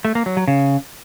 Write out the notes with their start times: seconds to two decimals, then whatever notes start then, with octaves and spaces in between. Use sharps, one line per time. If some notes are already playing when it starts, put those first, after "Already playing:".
0.05 A3
0.15 A#3
0.26 F#3
0.37 F#3
0.48 C#3